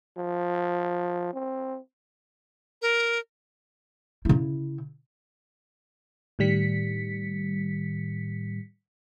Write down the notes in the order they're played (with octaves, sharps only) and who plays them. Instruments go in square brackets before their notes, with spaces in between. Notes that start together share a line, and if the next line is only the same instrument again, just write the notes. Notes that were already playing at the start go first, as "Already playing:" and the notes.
[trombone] F3
C4
[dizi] A#4
[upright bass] C#3 E4
[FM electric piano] A2 D#3 G3 B6 C#7